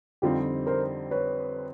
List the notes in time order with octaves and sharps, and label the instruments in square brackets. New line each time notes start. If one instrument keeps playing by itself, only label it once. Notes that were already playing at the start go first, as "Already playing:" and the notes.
[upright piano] F2 D3 G3 C4 D#4 [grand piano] F4 G4
[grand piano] A#4 C5
B4 C#5